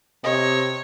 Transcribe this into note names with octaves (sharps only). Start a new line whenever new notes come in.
C3 C#5 D#5